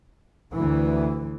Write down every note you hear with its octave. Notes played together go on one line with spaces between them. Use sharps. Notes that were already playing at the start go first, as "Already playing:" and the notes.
D2 E3